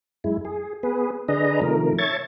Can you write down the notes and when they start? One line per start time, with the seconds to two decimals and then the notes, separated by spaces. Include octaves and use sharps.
0.24 F#2 G#3 E4
0.45 G#4
0.83 B3 G#4 B4
1.28 D3 D4 G#4 B4 D#5 A#5
1.62 C3 D#3 F3 A3 A#4
1.98 C#5 E5 A5 C#6 G#6 A6